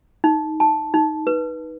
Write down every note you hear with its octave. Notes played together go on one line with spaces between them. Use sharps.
D#4
A5
D#4
B4